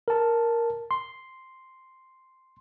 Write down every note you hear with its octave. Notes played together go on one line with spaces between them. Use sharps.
A#4 A5
C6